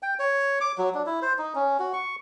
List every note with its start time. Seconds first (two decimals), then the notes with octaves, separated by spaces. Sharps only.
0.03 G5
0.19 C#5
0.61 D6
0.78 F#3
0.94 D4
1.06 E4
1.22 C5
1.38 D#4
1.55 C#4
1.79 F#4
1.93 C#6